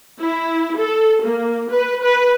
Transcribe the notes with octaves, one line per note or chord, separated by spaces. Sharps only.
E4
A4
A#3
B4
B4